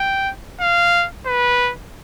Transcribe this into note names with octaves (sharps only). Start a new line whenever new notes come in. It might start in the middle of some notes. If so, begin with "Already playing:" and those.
Already playing: G5
F5
B4